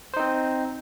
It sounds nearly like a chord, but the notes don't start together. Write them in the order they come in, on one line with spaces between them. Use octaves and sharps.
C5 D#4 C4